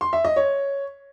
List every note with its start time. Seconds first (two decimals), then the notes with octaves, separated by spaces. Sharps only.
0.01 C6
0.13 E5
0.25 D#5
0.36 C#5